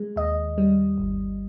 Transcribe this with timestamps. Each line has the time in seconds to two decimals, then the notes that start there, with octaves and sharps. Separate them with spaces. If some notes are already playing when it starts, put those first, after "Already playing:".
Already playing: G#3
0.16 D#2 D#5
0.58 G3
0.98 G1